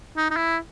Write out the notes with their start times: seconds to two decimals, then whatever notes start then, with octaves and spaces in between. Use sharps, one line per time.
0.17 D#4
0.31 D#4
0.36 E4